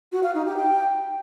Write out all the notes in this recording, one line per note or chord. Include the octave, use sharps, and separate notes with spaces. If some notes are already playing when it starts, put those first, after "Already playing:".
F#4
F5
D#4
G4
G5